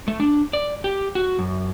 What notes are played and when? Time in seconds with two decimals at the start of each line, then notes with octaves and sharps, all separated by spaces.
0.08 A3
0.20 D4
0.53 D5
0.84 G4
1.15 F#4
1.39 F#2